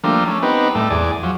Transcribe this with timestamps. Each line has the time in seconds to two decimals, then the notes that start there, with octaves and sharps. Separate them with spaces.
0.04 F3 G3 A3 A#3 D4
0.28 A3 C#4
0.43 B3 C4 D#4 G4 B4
0.75 A2 G3 A3
0.90 E2 G#4 D5
1.23 F3 F#3